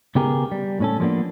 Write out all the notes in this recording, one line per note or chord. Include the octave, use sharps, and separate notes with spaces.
C#3 B3 G4 G#4 A#4
G3
A2 C#4 A4
F3 G3 A#3 B3 D4